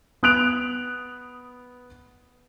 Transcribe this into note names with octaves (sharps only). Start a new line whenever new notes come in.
B3 D#6 F#6 D7 F7